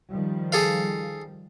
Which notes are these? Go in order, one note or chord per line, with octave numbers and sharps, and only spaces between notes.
D#3 F3 G3
G#4 A4 F5